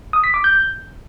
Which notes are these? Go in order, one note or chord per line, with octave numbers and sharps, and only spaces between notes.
D#6
B6
D6
G6